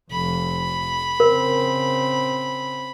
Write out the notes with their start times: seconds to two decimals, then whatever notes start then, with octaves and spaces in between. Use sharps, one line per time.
0.11 F1 F2 B5
1.20 C#3 C4 A#4